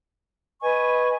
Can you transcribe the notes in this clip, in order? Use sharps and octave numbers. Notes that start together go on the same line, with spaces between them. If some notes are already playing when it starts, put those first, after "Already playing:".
B4 D#5 G#5 C#6